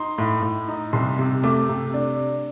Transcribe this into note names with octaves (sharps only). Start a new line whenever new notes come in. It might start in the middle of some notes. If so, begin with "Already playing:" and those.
Already playing: D#4 C6
A2
A2
D#4
C2 C6
C3
A3 D6
C3
D4